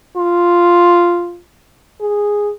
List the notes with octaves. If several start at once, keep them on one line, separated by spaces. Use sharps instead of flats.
F4
G#4